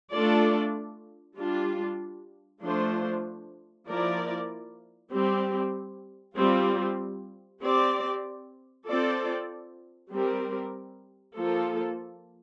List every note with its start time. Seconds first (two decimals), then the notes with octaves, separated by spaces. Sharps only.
0.12 A3 D4 F4 A4 D5
1.38 G3 D4 F4
2.62 F3 A3 D4 F4 C5
3.87 F3 A#3 E4 A#4 D5
5.12 G3 C4 G4
6.36 G3 C4 F4
7.62 C4 G4 D5
8.86 C4 F4 A4 D5
10.11 G3 C4 G4 A#4
11.36 F3 A#3 F4 A4